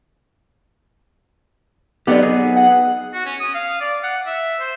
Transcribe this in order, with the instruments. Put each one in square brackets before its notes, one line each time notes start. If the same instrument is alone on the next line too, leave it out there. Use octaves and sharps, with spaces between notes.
[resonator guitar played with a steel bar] F#3 B3 D#4 [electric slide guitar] G4 A4 D5
[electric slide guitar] G#4
[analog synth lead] F#5
[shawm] F#4
C#4
D#6
F5
D5
F#5
E5
C5